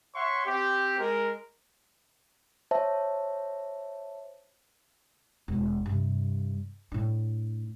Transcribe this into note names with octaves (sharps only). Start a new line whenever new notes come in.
C#5 E5 F#5 C6 C#6
C4 G4
G#3 A#4
C5 C#5 E5 A5
E1
G2 C3
A2 D4